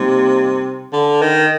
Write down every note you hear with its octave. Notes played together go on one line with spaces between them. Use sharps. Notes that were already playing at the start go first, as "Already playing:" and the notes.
Already playing: C3 G3 A#3 D#4 G4
D3
D#3